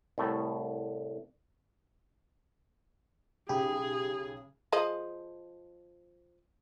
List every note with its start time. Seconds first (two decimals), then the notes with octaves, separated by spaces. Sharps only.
0.18 C2 A2 A3
3.49 B1 C#3 G4 G#4 B5
4.72 F3 G#4 D#5